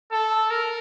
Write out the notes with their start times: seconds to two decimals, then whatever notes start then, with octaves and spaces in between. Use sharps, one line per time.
0.12 A4
0.51 A#4